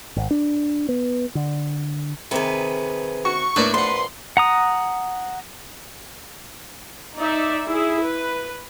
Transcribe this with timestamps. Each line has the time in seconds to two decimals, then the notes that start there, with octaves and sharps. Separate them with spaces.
0.17 G#1
0.31 D4
0.89 B3
1.35 D3
2.31 C3 D#3 G#4 B4
3.25 F#4 C#6
3.56 A2 A#3 D4 B4 D5 E5
3.74 A#1 B4 F#5 C6
4.37 F#5 A#5 D#6
7.16 D#4 D5 E5
7.68 E4 G#4
8.02 B4